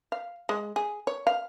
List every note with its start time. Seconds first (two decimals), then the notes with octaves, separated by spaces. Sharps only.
0.12 F5
0.49 G#3
0.76 G#4
1.07 C#5
1.27 F5